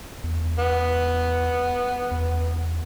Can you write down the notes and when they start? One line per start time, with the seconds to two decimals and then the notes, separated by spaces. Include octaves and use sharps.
0.24 E2
0.58 B3
2.11 E2